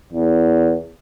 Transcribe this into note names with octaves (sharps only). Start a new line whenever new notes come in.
E2